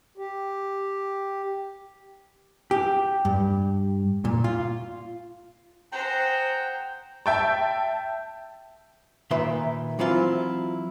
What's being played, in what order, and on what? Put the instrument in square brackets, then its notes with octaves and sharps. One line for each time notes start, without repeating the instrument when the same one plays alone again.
[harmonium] G4
[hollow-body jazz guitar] G4
G2
A#2
F4
[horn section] G#4 F#5 A#5 [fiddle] C5 [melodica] G5
[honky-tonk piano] E5 G5 A5
[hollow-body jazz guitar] A#2 D#3 A#3 B4 E5 C6
E3 F#3 C4 E4 F4